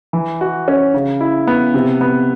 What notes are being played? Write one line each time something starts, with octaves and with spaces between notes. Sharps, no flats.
E3
F#4
C#4
C#3
E4
B3
C3
B3